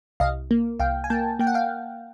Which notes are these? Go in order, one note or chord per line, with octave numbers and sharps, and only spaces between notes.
C2 D#5 F5
A#3
C2 F5 G5
G#5
A#3 G5 A5
A#3 G5
F#5
F5 G5